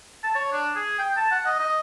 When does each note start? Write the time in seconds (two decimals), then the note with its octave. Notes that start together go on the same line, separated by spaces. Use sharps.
0.24 A5
0.35 C#5
0.52 D4
0.76 G#4
0.99 G5
1.17 A5
1.31 F#5
1.46 D#5
1.59 D#5